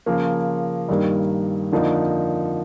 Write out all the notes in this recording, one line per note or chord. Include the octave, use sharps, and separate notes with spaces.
C#3 F3 A#3
G2 D#3 G3 A#3
F2 D3 F3 A#3 D#4